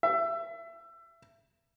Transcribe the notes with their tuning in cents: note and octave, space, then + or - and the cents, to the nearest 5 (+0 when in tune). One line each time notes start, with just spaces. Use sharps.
E5 +25